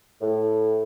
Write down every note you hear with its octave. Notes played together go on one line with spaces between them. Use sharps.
A2